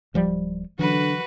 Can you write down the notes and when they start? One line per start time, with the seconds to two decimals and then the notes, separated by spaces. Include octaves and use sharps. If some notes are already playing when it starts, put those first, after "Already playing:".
0.14 D1 F3 G3
0.79 D3 E3 F#3 F#4 B4